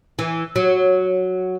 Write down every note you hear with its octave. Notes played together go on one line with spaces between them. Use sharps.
E3
F#3